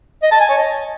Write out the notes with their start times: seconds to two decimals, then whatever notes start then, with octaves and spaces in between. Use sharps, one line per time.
0.23 D#5
0.32 A5
0.40 G#5
0.49 C#5
0.58 D#5